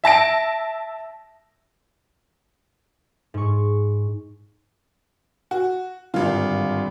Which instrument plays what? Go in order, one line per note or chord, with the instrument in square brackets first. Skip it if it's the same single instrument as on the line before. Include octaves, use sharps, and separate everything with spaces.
[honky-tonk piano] E5 A5 A#6 D7
[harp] G#2 C#6
[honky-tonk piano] F#4
[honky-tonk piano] G#1 F4 [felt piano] G2 D3